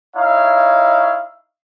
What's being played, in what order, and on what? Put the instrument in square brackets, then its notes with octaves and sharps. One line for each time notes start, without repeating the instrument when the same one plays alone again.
[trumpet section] D#4 E4 C#5 F5